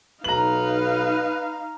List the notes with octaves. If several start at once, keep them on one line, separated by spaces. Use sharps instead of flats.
B1 D#4 B4 F5 A#5 F#7